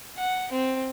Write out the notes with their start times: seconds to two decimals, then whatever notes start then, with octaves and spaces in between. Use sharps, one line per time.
0.18 F#5
0.52 C4